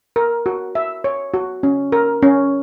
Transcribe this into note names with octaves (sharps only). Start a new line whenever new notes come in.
A#4
F#4
E5
C#5
F#4
C#4
A#4
C#4